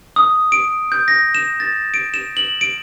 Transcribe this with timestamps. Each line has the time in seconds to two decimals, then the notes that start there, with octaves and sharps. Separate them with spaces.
0.16 D#6
0.52 D7
0.92 G6
1.08 A#6
1.35 E7
1.60 A6
1.94 D7
2.14 E7
2.37 F#7
2.61 D7